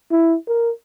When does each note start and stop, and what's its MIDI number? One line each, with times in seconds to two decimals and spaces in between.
0.11 0.35 64
0.48 0.70 70